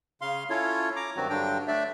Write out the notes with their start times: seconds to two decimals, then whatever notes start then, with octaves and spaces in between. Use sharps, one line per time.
0.21 C#3 F5 C6
0.50 C#4 E4 F4 A4 C#5
0.96 A#5 D6
1.16 G2 D#3 F#3 C4 F#4
1.30 G2 D3 F#3 D4 G5
1.68 A3 D4 D5 E5